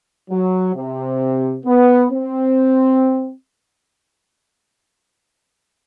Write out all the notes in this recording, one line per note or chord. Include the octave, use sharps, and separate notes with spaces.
F#3
C3
B3
C4